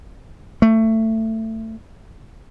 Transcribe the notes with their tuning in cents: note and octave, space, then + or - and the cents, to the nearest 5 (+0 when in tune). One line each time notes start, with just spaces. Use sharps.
A3 +20